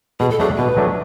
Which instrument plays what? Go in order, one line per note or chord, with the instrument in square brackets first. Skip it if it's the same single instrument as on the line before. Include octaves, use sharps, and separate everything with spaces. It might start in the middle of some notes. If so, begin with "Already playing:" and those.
[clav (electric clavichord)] B2 [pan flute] G#4
[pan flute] A4
[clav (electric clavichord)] F#3 A3 D4 [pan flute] G#4
[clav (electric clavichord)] B2 [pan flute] B4
[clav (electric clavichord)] F#3 A3 D4